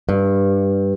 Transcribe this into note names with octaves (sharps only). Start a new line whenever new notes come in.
G2